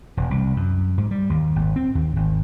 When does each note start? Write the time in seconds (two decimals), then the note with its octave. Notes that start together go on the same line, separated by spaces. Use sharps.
0.17 E1
0.31 C2
0.56 F#2
0.98 G#2
1.11 G3
1.30 D#2
1.56 G#1
1.76 C4
1.95 D#2
2.16 G#1